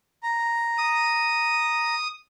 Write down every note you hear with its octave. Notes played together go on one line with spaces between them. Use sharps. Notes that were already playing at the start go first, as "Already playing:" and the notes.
A#5
D#6